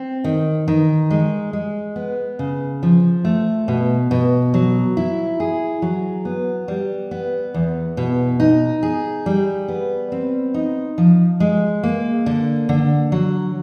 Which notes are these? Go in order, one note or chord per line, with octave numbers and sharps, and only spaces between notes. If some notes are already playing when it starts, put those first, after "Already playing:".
Already playing: C4
D#3
D#3
G#3
G#3
B3
C#3
F3
A3
B2
B2
F#3
E4
G#4
F#3
B3
G3
B3
E2
B2
D#4
G#4
G3
B3
C4
D#4
F3
G#3
A#3
D3
D3
F#3